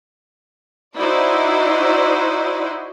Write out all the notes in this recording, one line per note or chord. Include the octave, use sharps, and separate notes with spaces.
D#4 E4 F#4 C5 D5